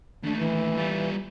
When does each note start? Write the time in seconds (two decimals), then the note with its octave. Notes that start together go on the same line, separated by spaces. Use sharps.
0.24 D#2 A3 D4
0.37 E3
0.78 G3 F4